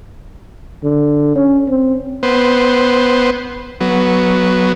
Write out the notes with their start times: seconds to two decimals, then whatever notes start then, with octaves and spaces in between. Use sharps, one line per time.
0.84 D3
1.36 C#4
1.69 C4
2.23 B3 C5
3.81 F#3 B3